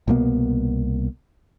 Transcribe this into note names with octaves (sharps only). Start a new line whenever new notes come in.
C2 B2 A#3 B3